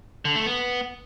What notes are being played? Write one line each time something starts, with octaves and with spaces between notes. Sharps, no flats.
D3
A3
B3